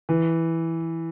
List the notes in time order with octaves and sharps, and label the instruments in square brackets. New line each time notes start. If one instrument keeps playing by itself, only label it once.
[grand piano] E3